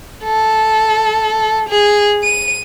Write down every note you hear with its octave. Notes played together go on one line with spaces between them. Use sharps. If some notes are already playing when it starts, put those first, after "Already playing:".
A4
G#4
D#7